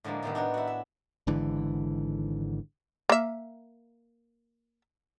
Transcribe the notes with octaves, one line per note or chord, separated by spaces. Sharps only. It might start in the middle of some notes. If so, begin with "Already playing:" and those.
A2 D3 F3 G#3 A#3
A2 C3 D#3 B3
D4 D#4 F#4 C#5
E4 F#4
E5
G#1 G#2 D3 E3
A#3 E5